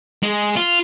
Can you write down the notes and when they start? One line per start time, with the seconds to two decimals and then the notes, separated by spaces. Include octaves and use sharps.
0.23 G#3
0.56 F4